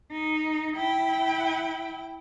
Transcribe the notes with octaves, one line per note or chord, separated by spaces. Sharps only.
D#4
E4 G5